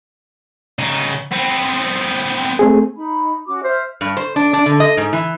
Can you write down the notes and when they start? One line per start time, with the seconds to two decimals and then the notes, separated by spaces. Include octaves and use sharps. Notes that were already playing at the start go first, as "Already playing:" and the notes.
0.79 C#3 D#4
1.32 B3 C4
2.59 A3 C4 G#4
2.96 D#4 B5
3.47 C#4 F#4 D6
3.64 C5 E5 F6
4.01 G2
4.17 C5
4.36 D4
4.53 D4
4.66 D3
4.80 D#5
4.97 G#2
5.13 E3